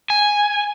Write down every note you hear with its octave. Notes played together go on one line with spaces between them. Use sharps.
G#5